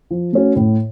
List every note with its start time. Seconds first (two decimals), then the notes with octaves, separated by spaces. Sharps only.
0.11 F3
0.33 A3 C#4 F#4
0.56 A2